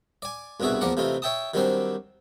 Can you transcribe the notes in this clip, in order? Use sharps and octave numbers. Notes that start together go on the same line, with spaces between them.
D5 G#5
C2 G2 B2 F#4 G#4 E5
E2 F3 A#3 A#4 D5 F#5
C3 E3 A3 D#4 F4
C#5 E5 G5 A5 D#6
D#3 F#3 G3 C4 D4 C5